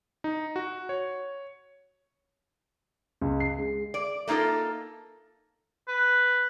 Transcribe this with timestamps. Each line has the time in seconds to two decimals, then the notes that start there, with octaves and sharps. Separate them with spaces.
0.24 D#4
0.56 F#4
0.89 C#5
3.21 C#2
3.40 C7
3.59 G#3
3.94 D5
4.27 A3 A#3 D#4 F4 A4
5.88 B4